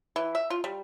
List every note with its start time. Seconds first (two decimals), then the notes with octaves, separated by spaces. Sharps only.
0.16 E3
0.35 E5
0.50 F4
0.64 G3